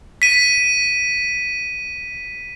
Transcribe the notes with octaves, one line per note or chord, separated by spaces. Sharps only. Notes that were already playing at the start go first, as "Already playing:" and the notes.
B6 D#7